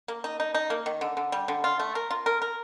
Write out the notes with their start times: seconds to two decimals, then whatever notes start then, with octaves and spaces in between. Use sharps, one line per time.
0.08 A#3
0.24 D#4
0.40 D#4
0.54 D#4
0.70 A#3
0.86 D#3
1.01 D3
1.17 D3
1.32 G3
1.48 D3
1.64 F4
1.80 A3
1.95 A#4
2.11 F4
2.26 A#4
2.42 A#4